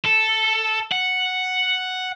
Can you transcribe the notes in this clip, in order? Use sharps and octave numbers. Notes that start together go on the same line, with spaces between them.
A4
F#5